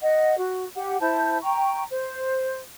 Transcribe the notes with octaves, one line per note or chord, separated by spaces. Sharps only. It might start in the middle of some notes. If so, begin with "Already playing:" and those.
D#5 F#5
F#4
G4 F#5
E4 C5 A5 G6
G5 A#5 C#6
C5